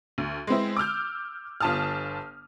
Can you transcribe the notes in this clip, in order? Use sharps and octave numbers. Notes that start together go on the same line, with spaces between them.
D2
G#3 B3 C4 E4
D6 E6 F6 G6
G1 F4 A5 D#6 F6